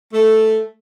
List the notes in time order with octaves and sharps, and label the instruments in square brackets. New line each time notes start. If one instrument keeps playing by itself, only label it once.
[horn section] A3